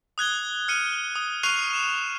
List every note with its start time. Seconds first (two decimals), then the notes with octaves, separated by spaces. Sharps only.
0.18 D#6 F#6 G#6 G7
0.68 F6 C#7 D#7
1.16 D#6
1.43 C#6 F6 F#6 C7 D#7 F7
1.73 E7